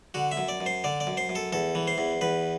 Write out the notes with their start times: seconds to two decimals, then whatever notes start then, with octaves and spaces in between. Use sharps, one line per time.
0.14 D3 F#4
0.32 E5
0.37 F#2
0.48 D5
0.60 F#2
0.66 C5
0.84 D3 D5
1.00 D5
1.07 F#2
1.17 C5
1.29 F#2
1.35 A4
1.53 E2 A4
1.75 E3
1.87 C5
1.98 E2
2.21 E2 B4